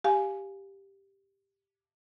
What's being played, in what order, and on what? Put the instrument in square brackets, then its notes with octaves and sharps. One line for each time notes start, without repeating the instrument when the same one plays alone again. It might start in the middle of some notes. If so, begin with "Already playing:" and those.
[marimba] G4 F5 G#5